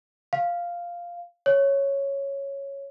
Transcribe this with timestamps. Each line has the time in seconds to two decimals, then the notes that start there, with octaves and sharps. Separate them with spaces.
0.33 F5
1.46 C#5